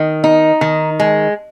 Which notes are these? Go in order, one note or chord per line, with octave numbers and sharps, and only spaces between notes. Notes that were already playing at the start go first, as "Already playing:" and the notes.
Already playing: D#3
D#4
D#3
G#3